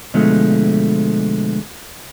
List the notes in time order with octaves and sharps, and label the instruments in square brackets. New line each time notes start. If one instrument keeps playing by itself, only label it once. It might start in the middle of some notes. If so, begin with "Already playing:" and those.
[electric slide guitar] B2 D3 F3 G#3 A3